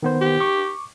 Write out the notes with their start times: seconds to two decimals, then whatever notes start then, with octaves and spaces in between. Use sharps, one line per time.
0.03 D#3 B3 C5
0.21 G4
0.40 C#6 D6